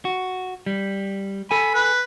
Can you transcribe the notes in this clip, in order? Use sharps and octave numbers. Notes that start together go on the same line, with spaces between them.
F#4
G3
A4 G#5 B5
B4